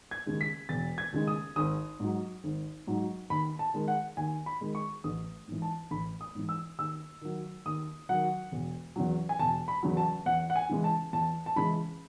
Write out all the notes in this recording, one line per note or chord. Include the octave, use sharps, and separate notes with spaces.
G#6
D#2 C#3 G#3
B6
E1 A6
G#6
D#2 C#3 G#3
D#6
G#1 D#6
G#2 F#3
G#1
G#2 F#3
D#2 B5
A5
D#3 G#3
F#5
D#2 G#5
B5
D#3 G#3
C#6
A1 D#6
G#2 E3
A5
A1 B5
D#6
G#2 E3
E6
D#2 E6
D#3 F#3
D#2 D#6
D#3 F#3 F#5
E1
E2 C#3 F#3
G#5
E1 A5
B5
E2 C#3 F#3
A5
E2 F#5
F#5
G#5
C#3 E3 G#3
A5
E2 A5
A5
C#3 E3 G#3 B5